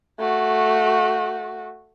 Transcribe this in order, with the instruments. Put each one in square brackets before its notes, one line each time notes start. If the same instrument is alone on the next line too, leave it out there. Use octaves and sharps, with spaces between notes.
[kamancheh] A3 F#4